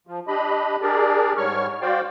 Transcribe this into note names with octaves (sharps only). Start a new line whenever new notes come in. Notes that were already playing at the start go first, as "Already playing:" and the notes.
F3
D4 G4 D#5 B5
D4 G4 G#4 A#4 D5
G#2 G3 C#5 C#6 F6
F#4 C5 D5 F5 G5